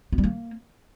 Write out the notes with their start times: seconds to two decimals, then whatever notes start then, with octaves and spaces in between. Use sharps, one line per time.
0.12 B3
0.18 G3
0.24 A#3